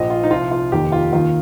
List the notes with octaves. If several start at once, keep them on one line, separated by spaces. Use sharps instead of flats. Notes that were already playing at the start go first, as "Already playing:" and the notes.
Already playing: A#1 A#2 F3 D#5
F4
D#4
C2 C3 F3 F4
F4
F1 D#2 D#3 G4
F4
D#2 D#3 F4